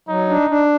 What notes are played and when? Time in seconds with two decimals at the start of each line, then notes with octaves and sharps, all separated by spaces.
0.08 F#3 D#4
0.29 D4
0.50 D4